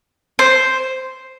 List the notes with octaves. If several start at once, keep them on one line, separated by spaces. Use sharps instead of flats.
C5